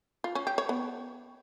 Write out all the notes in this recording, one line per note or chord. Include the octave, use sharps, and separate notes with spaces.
F4
C#4
G4
C#5
B3